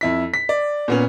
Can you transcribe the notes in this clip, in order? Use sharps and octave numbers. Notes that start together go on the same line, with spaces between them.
F2 E4 B6
B6
D5
A#2 B3 C#4